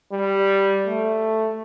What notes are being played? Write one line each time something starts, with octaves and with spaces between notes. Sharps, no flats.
G3
A3